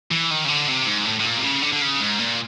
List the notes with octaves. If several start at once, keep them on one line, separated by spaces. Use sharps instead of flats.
E3
D#3
C#3
D3
C3
G#2
A2
A2
A#2
C3
C#3
D3
D3
C#3
G#2
A#2